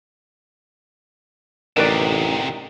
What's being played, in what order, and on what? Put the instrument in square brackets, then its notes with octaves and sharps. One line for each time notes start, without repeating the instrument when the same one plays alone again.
[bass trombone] A1 [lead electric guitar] D2 C3 [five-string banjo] D#3 B4 D5